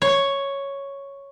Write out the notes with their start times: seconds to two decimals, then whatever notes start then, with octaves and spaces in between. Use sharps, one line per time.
0.02 C#5